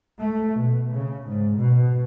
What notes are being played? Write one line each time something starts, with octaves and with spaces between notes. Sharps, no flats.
A3
B2
C#3
G#2
B2